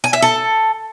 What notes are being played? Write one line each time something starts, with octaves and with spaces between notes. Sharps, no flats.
G#5
E5
A4